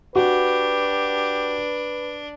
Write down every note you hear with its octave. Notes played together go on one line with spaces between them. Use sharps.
D4 F#4 G4 B4